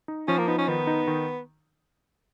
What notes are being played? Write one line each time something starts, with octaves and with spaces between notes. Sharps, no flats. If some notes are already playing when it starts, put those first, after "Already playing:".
D#4
F3 C#4
A#3
B3 D#4
C#4
D#3 B3
D#4
D#3